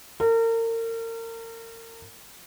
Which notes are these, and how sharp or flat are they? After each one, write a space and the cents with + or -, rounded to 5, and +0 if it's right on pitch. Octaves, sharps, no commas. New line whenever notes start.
A#4 -35